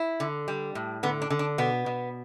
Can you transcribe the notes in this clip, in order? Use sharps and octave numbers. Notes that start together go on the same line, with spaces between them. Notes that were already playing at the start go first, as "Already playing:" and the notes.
Already playing: E4
D3
G3
A2
D3 B3
D4
D3
D4
B2 B3
B2